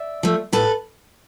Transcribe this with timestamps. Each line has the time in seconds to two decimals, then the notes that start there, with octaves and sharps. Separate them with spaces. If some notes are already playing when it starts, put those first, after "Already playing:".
Already playing: D5 E5
0.23 F3 A3
0.53 A2 A4 B4